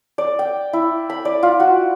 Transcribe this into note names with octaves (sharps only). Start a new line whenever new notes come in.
D5
G5
E4
B5
D5
F4
F#4